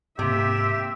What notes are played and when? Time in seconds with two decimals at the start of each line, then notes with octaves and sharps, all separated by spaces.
0.19 G#2 C3 A#3 G4 E5